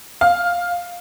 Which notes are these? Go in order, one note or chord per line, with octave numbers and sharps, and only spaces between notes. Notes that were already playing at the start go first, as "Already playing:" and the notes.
F5